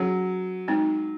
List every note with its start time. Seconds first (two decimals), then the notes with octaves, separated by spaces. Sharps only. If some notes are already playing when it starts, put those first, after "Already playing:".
Already playing: F#3 C#4 G#4 C#5
0.68 G#3 C4 D#4